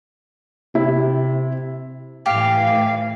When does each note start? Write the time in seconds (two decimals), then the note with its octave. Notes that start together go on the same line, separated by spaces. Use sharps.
0.75 C3 E4
2.26 A2 E3 G4 F5